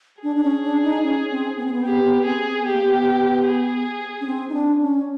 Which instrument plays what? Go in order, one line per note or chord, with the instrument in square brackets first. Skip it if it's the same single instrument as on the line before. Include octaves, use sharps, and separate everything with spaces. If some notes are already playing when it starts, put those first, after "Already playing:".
[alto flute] D4 [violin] G#4
[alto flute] D4
C#4
D4
D#4
C#4
C4
B3
C4
B3
[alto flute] B3 [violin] G4
[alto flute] B3
[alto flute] C4 [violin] G#4
[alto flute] C4
B3
[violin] G4
[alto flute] A#3
B3
[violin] G#4
[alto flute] C#4
C4
D#4
D4
C#4